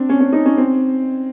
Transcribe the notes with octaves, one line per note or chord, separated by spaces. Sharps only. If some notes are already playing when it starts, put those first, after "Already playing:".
Already playing: C4 D4
C#4
C#4
D#4
C#4
C4